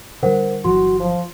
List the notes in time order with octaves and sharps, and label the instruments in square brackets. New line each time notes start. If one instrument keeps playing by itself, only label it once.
[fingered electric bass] D3 F#3 G3 [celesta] A#4 C5 F#5
[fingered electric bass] G1 E3 F#3 [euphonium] F#4 [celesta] C6
[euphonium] F3